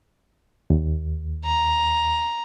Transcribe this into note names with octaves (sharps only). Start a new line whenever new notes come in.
D#2
A#5